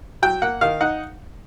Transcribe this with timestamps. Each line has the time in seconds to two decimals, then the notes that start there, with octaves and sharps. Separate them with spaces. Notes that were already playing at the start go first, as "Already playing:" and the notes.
0.22 F#3 G5
0.42 A#3 F#5
0.61 D#3 F5
0.81 D#4 F#5